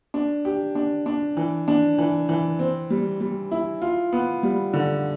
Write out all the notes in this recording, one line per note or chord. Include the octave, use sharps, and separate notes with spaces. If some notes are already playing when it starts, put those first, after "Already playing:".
D4
G4
D4
D4
E3
D4
E3
E3
C4
G3
G3
E4
F4
B3
G3
D3